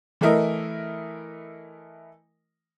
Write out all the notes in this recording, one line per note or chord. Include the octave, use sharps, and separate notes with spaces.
E3 A3 E4 A#4 D#5